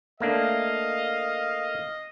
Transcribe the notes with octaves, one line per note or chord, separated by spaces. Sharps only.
A3 A#3 D4 D#5 F5